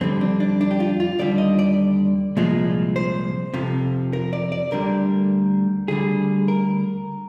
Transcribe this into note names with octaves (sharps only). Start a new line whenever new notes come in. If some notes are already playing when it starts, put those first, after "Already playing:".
F2 D3 G3 C4
D4
D4
D4
G4
F4
F4
D#2 D3 G3 D5
D#5
D5
C2 A#2 F3 G#3
C5
F2 C3 F3
A#4
D5
D5
D2 D3 G3 A#4
D2 D3 G3 G#4
A#4